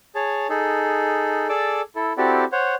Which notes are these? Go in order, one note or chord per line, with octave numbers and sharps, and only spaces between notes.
G#4 C#5 A5
D#4 G#4 A4
G#4 A4 D5 D6 E6
E4 A4
C4 E4 F#4 G4 A4 D5
C5 C#5 F#5